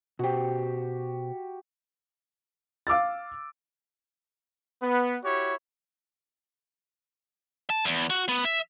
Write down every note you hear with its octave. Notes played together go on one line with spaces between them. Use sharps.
B2 F#4 G4 C5
F5 D6 E6 A6
B3
E4 F#4 G4 C#5
A5
E2
F#4
B3
E5